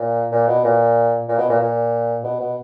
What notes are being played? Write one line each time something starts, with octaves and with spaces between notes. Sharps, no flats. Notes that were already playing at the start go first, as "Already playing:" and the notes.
Already playing: A#2
A#2
B2
A#2
A#2
B2
A#2
A#2
B2
B2